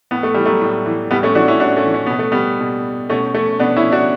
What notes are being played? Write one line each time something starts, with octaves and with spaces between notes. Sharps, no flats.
A2 B3
A3
E3 G3
F#3 A3
A2
E3
A2 G3 B3
A3 C#4
E3 D4 F#4
C#4 E4
A2 D4 F#4
A3 C#4
E3
C#4
B2 B3
A3
G3 B3
B2
B2 A3 C#4
A3 C#4
B2 B3 D4
C#4 E4
D4 F#4